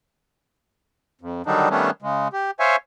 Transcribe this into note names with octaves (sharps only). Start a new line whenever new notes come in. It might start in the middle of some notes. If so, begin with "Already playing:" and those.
F2
D3 D#3 F#3 G3 D4 D#4
D#3 G3 A3 B3 C#4 D4
C#3 G#3
G4
C5 C#5 E5 F5 G#5 C#6